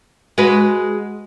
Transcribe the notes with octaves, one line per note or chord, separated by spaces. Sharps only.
G#3 F#4 B4